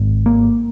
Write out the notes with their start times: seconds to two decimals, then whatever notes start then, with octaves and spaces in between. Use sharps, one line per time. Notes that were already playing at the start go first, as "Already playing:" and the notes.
Already playing: G#1
0.26 A#3